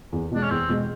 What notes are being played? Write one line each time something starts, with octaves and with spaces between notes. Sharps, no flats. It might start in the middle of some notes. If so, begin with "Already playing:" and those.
E2
B2 G#3 D4
C#4
E2 C4
B2 G#3